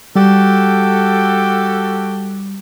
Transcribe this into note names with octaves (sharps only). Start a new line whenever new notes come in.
G3 F#4 G4 A4